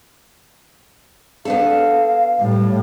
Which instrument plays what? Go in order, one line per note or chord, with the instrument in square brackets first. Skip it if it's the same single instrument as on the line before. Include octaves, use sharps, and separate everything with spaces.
[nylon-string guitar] B3 D4 A4 [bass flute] F5
[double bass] A2 G3